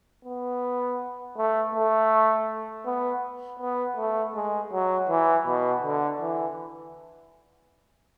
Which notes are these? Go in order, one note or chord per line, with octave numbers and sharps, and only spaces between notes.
B3
A3
A3
B3
B3
A3
G#3
F#3
E3
B2
D3
E3